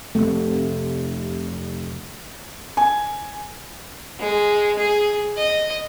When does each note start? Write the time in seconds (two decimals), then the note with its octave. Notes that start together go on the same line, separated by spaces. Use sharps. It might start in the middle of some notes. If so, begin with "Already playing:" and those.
0.15 F1 C#2 C3 A3
2.77 G#5
4.20 G#3
4.78 G#4
5.37 D#5